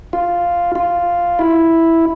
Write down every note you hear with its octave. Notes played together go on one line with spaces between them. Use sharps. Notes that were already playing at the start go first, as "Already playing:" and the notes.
F4
F4
E4